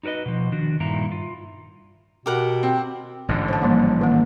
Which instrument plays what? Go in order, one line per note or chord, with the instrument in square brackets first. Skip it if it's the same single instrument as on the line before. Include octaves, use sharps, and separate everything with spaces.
[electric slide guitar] D#4 F#4 A#4 B4 D#5
B2 F3
D#3 D4 F#4
G2 A#2 D#3 A#3 E4 A#5
F4
[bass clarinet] B2 [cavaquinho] G4 A#4 F#5
[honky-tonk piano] C4
[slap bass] A1 G#2 D3
[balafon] C5 A5
F3 G3 A#3
D#3 A#3